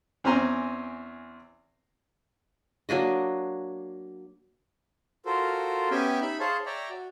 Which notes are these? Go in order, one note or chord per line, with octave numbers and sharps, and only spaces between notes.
E2 C4 C#4 G#5 A#5 C6
F#3 A#3 D4 D#5
F4 F#4 A4 A#4 C5
B3 C#4 G4 E5 G5 G#5
D#4 E5 B5
G#4 C5 C#5 F5 A5
C#5 D5 E5 G5 A#5
F#4